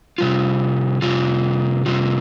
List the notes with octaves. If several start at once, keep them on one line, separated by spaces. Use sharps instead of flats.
C3 G3 F4
C3 G3 F4
C3 G3 F4